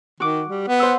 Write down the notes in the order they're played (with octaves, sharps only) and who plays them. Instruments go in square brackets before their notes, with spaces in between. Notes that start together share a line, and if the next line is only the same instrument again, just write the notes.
[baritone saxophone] D#3 [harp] F#4 D6
[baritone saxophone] G3
B3
[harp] C5 F#5 E6